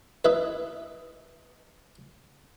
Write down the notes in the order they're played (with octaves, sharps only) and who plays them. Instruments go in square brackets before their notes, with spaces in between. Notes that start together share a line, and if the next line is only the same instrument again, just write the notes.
[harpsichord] D#4 E4 B4